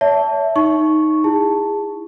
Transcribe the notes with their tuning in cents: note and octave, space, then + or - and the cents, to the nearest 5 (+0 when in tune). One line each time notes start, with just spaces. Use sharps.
C#5 +40 E5 +0 A5 +0
D#4 +0 C#6 +0
E4 +10 G#4 -25 A5 +0